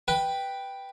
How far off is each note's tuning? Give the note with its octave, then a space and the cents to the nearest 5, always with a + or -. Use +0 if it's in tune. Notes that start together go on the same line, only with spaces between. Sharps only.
B4 +0 G5 +0